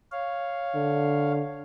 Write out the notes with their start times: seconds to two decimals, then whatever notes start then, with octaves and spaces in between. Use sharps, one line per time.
0.12 C#5 F5
0.75 D3